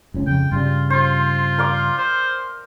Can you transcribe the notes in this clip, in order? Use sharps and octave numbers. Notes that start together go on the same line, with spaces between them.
F#1 C#2 C#4
F2 C#3 G5
G2 C#3 G3 F4
F4 C5
A#4 F5 D6
C5